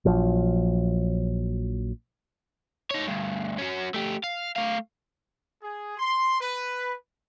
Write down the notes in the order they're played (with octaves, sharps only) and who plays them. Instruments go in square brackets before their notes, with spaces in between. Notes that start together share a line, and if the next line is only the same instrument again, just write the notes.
[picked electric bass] A#1 F3 F#3
[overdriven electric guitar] D#4 C#5
D2 G2
C#4 F#4
A3 G4
F5
A3 F5
[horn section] G#4
C6
B4